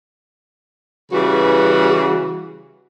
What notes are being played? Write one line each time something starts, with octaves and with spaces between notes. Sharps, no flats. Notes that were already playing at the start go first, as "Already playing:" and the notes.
C#3 E3 G3 F#4 B4